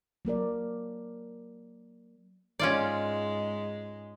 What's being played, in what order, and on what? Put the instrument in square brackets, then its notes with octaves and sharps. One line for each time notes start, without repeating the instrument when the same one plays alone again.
[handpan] F#3 A#3 A#4 D5
[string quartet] G#2 G#3 [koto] C#4 F4 D5